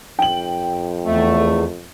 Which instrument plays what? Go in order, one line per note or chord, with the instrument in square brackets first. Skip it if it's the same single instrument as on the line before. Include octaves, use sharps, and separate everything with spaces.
[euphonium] F2 [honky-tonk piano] G5 F#7
[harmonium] E2 [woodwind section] A3